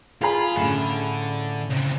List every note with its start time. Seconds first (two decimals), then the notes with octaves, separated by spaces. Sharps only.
0.22 F4 G#4 B5
0.56 A2 D3 C#4
1.70 C#3 C4